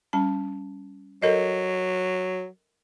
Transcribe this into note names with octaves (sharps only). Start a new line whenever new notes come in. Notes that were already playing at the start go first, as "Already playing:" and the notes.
G3 C#4 A5
F#3 A4 A#4 D#5